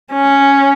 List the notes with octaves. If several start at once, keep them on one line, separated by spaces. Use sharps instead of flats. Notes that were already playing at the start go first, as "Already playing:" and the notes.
C#4